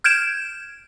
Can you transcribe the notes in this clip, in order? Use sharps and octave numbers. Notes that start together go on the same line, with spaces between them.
F6 G6 G#6 D7 E7